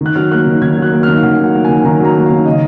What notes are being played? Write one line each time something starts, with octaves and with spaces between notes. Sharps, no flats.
D#3 F#6
F#3 F6
A#3 F#6
D#3
D#3 G#6
F#3 F#6
A#3
D#3 F6
F5
D#3 F#5
F#3
F#5
A#3
D#3 G#5
D#3 A#5
F#3
A#5
A#3
D#3 F5
C#3 D#5